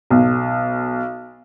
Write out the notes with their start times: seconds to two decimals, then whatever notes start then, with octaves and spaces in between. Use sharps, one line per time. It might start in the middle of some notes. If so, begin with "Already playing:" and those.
0.10 B1